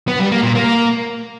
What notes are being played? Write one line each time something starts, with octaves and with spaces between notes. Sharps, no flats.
B3
G3
A#3
A#2
A#3